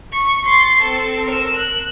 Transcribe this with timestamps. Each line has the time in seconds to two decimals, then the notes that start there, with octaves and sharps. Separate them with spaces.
0.13 C#6
0.45 C6 A6
0.82 C4 A4
1.26 A#4 E6
1.57 F#6